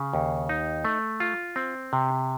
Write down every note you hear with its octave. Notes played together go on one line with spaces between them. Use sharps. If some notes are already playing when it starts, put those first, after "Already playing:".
Already playing: C#3
D#2
D#4
A3
F4
C4
C3